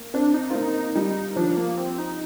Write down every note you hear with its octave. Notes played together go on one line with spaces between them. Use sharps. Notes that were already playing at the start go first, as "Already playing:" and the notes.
Already playing: A#3
C4 D4
D#4
C4 F4
A#3 D#4
G3 D#4
F3 D4
A#3
C4
D#4